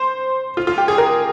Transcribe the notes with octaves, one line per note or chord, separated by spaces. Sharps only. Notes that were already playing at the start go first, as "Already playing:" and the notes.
Already playing: C5
F4
F4
G4
G#4
A#4